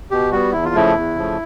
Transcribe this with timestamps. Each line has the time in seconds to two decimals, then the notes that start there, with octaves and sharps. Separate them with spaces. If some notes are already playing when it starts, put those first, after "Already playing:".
0.11 B2 G4
0.32 G3 B3 F#4
0.52 E2 E4
0.65 F4
0.75 C#3 F3 A3 E4
0.95 E2
1.16 C#3 F3 A3